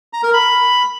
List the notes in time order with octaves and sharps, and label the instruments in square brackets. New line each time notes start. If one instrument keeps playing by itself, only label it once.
[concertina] A#5
A#4
B5